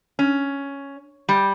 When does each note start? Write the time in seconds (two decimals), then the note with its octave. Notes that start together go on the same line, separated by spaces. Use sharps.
0.19 C#4
1.29 G3